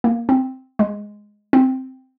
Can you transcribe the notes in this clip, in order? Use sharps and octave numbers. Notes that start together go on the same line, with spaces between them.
A#3
C4
G#3
C4